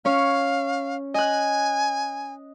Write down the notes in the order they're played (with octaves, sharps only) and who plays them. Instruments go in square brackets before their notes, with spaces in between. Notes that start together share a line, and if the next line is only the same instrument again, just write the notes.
[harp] C#4 C#5 [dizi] F5
[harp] D#5 F#6 [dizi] G#5